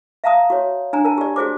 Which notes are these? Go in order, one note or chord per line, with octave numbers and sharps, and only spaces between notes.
E5 F5 A5 A#5 D#6
F#4 C#5
D4 G#5 A#5
A#4 A5
G4 D5
F#4 G#4 C5 D6